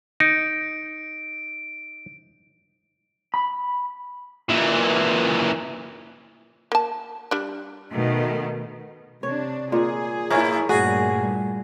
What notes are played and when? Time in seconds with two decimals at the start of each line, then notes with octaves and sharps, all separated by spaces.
0.20 D#4 D7
3.34 B5
4.49 A#2 E3
6.72 A#3 A5
7.31 G3 D4
7.92 B2 D#3 A3
9.23 C3 D4 C#5
9.72 A#2 G#4
10.30 A2 E4 A#4 C#5
10.69 G2 A#2 A3 F#4 G#4